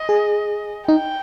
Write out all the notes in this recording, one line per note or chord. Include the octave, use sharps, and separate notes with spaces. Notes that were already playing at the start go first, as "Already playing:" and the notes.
Already playing: D#5
G#4
D#4 G5